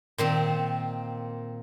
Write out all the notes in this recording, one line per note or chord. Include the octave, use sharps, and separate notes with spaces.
A#2 D#3 C4